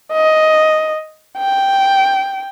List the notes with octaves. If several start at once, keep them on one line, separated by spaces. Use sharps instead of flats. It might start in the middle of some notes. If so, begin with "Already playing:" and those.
D#5
G5